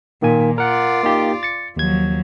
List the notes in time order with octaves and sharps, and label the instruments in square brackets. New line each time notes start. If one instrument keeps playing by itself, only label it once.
[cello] A#2 [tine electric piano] D#3 A#3 G#5
[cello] F4 D5 [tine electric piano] A#4 F#5
[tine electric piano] A#3 D#4 G4
A6 C#7
[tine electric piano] D#2 G#6 [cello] F3 F#3